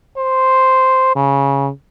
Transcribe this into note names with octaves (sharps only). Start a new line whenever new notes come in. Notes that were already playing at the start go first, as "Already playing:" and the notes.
C5
C#3